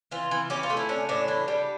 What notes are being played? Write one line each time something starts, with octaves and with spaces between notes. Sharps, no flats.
E3 F4
E3
C#4 G4
F4
A3
E4
C#4 D4
A2 D4
E3 D4
G3